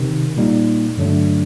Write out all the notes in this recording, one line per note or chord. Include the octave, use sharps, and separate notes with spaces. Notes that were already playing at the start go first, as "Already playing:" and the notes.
Already playing: C3 D#3
A#2 G3 A#3 D#4
G2 D3 F#3 A3 D4